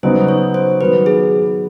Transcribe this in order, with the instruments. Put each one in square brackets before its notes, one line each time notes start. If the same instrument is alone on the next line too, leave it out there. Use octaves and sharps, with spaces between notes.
[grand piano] C#3 F#3 B3 D#4 F#4 [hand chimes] C5
[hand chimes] C#5
C5
[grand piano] D#3 F#3 B3 [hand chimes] B4
[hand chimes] G#4